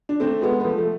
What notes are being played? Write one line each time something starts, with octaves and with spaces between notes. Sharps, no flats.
D4
A3 C4
G#3 B3
B3
F3 A3
A3